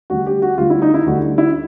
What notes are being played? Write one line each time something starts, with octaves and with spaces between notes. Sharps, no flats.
D2 D3 G3 F#4
G4
F#4
D2 D3 G3 F4
E4
D#4
E4
D2 D3 G3 F#4
E4